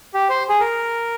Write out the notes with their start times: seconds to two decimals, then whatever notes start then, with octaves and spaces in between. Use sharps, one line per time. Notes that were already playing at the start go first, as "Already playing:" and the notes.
0.14 G4
0.29 C5
0.49 G#4
0.60 A#4